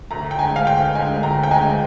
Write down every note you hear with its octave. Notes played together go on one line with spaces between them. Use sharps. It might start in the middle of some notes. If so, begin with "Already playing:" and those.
D2 A#5
G5
D3 G#3 G#5
F5
D2 G5
D3 G#3 G#5
D2 A#5
G5
D3 G#3 G#5